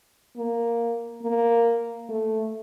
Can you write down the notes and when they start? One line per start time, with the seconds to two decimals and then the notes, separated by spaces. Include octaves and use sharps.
0.37 A#3
1.22 A#3
2.09 A3